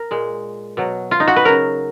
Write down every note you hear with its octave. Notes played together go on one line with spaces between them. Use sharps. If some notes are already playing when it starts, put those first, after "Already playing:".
Already playing: A#4
A#2 G#3
B2 F#3
F4
D#4
F#4
B4
C#3 F#3 A#4